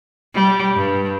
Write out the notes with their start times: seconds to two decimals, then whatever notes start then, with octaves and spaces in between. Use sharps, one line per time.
0.34 G3
0.76 G2